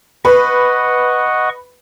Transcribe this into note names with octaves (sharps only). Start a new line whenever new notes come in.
B4 D#5 F#5 C#6